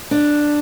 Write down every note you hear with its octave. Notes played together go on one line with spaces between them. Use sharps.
D4